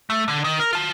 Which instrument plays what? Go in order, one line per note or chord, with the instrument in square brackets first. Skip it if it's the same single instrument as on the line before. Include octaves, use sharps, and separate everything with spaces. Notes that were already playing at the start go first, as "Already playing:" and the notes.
[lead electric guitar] A3
D3
D#3
A#4
F4 A5